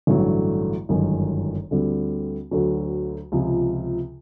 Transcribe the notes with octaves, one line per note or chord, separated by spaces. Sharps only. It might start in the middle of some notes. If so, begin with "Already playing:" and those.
A1 G2 D3 F#3 A3
G1 F#2 D#3 G#3
D2 D3 G3 C4
D2 D3 F#3
C#2 C3 F3